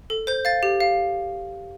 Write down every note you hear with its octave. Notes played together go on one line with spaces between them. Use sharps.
A4
C5 G6
F5 A6
G4
F5